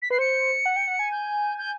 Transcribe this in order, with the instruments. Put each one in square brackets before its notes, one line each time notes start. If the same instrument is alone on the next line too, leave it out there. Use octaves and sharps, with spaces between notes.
[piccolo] B6
[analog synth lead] B4 [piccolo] C7
[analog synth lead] C5 [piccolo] C#7
[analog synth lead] F#5
G5
F#5
G#5
[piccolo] G6
G6